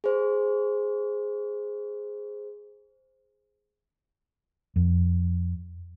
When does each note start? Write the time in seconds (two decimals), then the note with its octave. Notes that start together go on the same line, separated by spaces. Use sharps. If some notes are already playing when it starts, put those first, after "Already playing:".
0.04 G#4 C5
4.76 F2